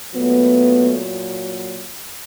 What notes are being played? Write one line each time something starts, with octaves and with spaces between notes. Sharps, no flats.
A#2 F#3 A3 B3